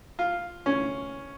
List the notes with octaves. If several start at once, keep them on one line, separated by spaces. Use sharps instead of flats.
F4
C#4